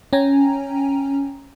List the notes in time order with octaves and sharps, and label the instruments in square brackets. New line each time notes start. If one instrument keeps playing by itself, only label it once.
[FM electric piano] C#4 G5 G#5 A#5